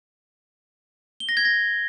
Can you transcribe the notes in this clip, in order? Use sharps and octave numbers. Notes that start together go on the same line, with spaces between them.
G7
A#6
G#6
A#6